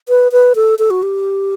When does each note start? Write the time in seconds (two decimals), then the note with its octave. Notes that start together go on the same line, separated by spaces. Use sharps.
0.09 B4
0.32 B4
0.55 A4
0.79 A4
0.90 F#4
1.03 G4